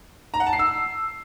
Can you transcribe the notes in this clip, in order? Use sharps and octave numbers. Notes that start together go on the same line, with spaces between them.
A#5
F#5
A5
C7
E6